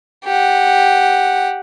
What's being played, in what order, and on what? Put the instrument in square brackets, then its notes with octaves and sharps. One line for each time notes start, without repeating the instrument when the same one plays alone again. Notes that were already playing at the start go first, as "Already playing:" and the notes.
[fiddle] G4 F#5